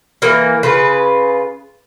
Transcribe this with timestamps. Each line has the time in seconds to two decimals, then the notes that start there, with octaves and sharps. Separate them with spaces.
0.22 E3 A#3
0.63 C#3 F4 B4